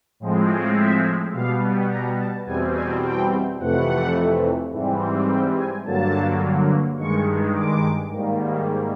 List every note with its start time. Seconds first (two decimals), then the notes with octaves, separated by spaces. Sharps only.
0.20 A2 F3 G#3 C4
0.76 E5
1.32 B2 G3 B3 F5
1.89 A#5
2.18 A5
2.46 E2 B2 G3 C4 G#5
2.74 G#5
3.02 G5
3.59 F2 C3 E3 A3 F#5
4.71 G#2 E3 G3 C4
5.28 G5
5.56 G#5
5.84 G2 D3 F#3 A#3 A5
6.97 G2 D#3 G#3 C#6
7.54 D6
8.10 G#2 D#3 G3 A#3